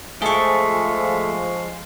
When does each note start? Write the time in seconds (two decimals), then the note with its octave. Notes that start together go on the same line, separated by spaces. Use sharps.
0.22 F3 G#3 A3 G#4 F5 C#6